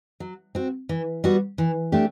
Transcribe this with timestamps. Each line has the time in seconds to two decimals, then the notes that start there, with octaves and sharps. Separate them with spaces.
0.20 F#3
0.55 C4 F#4
0.89 E3
1.24 G3 B3 F#4
1.58 E3
1.92 A3 D4 G4